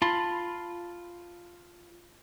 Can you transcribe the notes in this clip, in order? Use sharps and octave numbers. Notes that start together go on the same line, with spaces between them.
F4 A5 B5 C6